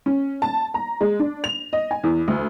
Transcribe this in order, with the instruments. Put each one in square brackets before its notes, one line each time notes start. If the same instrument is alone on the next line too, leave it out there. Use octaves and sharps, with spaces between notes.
[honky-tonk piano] C#4
A5
A#5
G#3
D4
F7
D#5
G#5
E2
D2